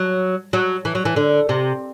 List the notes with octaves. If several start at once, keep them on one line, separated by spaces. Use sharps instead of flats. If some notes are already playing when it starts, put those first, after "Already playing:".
Already playing: F#3
F#3
E3
F#3
E3
D3
C3